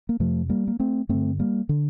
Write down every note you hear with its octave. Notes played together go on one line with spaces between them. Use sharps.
A#3
F2 C3 F3 A3
G3 A#3
A#3
A3 C4
G2 D3 A3 C4
G3 A#3
D3